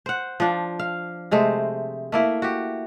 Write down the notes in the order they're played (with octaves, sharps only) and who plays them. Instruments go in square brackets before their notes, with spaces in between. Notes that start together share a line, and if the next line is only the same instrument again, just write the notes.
[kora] C5 F#5
F3 D4
F5
C3 G#3 A3 C5
A3 A#3 E4
F#4 G4